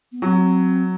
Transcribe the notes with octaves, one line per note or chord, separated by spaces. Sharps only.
B3
F#3 C4